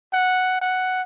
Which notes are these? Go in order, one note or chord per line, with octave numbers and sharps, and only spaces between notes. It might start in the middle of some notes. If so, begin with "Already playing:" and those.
F#5
F#5